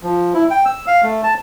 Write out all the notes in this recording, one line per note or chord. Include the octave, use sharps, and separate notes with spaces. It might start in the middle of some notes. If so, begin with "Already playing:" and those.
F3
E4
G5
E6
F5
A3
A5